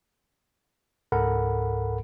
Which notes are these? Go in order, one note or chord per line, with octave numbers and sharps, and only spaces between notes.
C#2 G#2 A4 A#4 F#5 B5